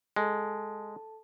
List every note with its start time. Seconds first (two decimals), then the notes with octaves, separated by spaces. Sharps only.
0.16 G#3 A4 A5